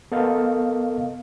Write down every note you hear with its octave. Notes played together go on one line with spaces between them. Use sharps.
B3 A4 A#4 D#5 F5